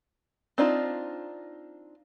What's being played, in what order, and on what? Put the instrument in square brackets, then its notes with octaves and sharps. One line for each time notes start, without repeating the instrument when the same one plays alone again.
[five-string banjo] C4 D4 D#4 F4